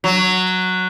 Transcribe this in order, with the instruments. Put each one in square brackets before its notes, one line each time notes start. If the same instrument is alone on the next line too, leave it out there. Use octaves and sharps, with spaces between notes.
[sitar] F#3